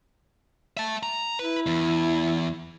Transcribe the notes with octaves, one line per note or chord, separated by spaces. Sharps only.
E5 A5
A#5
E4 B4
E2